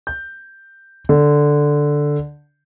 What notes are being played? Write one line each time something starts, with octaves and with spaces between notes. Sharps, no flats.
G6
D3